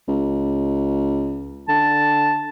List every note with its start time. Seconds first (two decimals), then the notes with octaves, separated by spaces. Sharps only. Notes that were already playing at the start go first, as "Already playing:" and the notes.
0.08 C#2
1.68 D3 A5